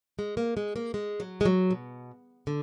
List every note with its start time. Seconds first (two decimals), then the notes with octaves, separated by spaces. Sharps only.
0.19 G#3
0.37 A#3
0.57 G#3
0.76 A#3
0.94 G#3
1.20 F#3
1.41 G#3
1.45 F#3
1.71 B2
2.47 D3